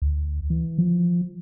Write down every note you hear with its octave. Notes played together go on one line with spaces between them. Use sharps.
D2
E3
F3